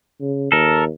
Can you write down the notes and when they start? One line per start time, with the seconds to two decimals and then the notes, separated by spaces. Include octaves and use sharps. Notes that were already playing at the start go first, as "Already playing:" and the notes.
0.21 C#3
0.52 D#2 A4 A#4